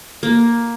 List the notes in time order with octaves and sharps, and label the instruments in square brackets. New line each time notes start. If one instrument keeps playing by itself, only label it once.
[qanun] A#3